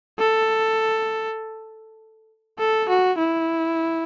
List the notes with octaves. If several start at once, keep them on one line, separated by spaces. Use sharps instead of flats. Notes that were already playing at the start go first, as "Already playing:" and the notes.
A4
A4
F#4
E4